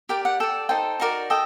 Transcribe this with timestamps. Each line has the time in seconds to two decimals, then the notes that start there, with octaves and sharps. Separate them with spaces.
0.09 G4 A#4 D5 G5
0.25 F#5
0.40 A4 D5 G5
0.69 D#4 A4 C5 G5
1.00 D#4 F#4 A#4 D5
1.30 A4 D#5 G5